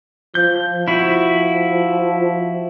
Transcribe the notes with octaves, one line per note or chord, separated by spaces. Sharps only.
F3 G6
F3 E4 F#4